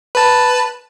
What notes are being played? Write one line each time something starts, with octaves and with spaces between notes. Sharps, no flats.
B4 A5